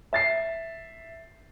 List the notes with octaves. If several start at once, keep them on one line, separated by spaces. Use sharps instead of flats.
E5 A6 C7